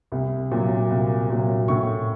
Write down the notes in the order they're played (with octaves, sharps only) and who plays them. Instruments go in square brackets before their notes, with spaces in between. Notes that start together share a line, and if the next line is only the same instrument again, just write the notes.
[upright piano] C2
A#2 F#3
C2
A#2 F#3
A2 C#6